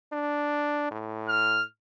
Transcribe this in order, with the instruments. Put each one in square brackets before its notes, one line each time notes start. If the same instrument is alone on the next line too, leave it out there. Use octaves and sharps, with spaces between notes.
[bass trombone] D4
A2
[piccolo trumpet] F6